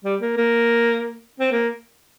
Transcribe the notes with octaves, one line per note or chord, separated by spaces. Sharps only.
G3
A#3
A#3
C4
A#3